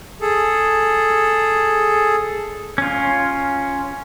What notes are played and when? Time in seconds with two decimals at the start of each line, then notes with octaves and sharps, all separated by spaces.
0.21 G#4 A4
2.78 C#4 F4